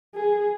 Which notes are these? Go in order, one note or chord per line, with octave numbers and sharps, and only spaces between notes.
G#4